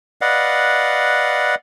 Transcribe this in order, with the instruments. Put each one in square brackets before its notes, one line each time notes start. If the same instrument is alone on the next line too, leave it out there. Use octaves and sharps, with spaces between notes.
[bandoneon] B4 D5 D#5 F5 F#5